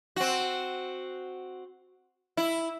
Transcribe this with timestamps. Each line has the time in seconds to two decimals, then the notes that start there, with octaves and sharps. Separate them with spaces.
0.16 C4 F#4
2.37 E4